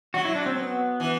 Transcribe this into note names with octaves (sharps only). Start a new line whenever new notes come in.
F#3 F#4
E4
D4
C4
B3
E3